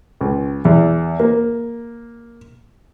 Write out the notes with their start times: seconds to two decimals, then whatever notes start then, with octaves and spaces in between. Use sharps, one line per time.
0.21 C#2
0.65 E2
1.20 A#3